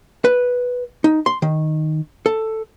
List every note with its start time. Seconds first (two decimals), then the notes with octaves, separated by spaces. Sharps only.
0.25 B4
1.04 D#4
1.26 C6
1.42 D#3
2.26 A4